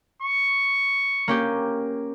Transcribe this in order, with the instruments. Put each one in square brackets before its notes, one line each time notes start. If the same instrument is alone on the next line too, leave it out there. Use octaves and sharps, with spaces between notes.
[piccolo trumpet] C#6
[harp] A#3 C#4 G4